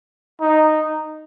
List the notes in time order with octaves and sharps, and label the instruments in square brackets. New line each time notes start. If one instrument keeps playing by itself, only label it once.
[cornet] D#4